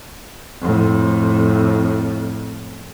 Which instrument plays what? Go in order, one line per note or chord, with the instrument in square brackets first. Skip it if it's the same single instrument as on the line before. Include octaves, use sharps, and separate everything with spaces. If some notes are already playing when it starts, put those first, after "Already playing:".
[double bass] F2 A2